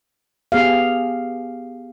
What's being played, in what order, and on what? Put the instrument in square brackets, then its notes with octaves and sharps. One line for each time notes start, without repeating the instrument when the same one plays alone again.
[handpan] B3 G4 G#4 F5